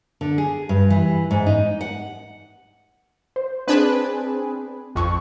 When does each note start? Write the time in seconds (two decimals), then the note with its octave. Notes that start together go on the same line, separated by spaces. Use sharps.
0.21 D3
0.38 G#4
0.69 G2
0.90 E3
1.31 G#2
1.46 D#4
1.81 F#5
3.36 C5
3.68 C4 D4 G#4 B4
4.95 A1 F2 C#6